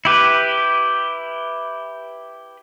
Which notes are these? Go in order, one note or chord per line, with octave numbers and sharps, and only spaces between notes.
E4 G4 B4